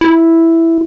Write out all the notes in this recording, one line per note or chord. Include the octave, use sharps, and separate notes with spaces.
E4